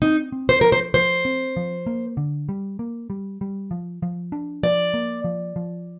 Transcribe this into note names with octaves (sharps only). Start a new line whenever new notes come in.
C4 D#4
C4
C5
F3 A#4
C5
F3 C5
C4
F3
A#3
D3
G3
A#3
G3
G3
F3
F3
D4
F3 D5
A#3
F3
F3